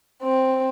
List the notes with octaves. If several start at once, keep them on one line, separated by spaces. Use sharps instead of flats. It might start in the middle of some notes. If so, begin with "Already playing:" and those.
C4